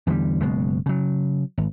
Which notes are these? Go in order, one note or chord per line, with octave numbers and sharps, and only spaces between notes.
E2 D3 D#3 G3
F#1 B2 G#3
C#3 F#3
G#1